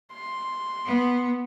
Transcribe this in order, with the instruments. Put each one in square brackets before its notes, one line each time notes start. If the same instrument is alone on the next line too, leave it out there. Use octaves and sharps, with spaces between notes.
[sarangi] C6
[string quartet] B3